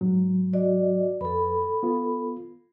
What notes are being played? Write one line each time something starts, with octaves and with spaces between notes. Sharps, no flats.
G#2 F#3
F#4 D5 D#5
F2 A4 B4 B5
B3 F4